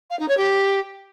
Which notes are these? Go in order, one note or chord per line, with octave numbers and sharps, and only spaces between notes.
F5
D#4
C#5
G4